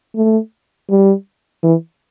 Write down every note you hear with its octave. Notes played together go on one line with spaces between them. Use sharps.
A3
G3
E3